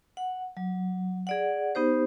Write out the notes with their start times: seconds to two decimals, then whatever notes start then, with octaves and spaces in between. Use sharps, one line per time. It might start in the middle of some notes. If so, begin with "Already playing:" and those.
0.17 F#5
0.57 F#3
1.27 G#4 D5 F#5
1.75 B3 D#4 G4 C5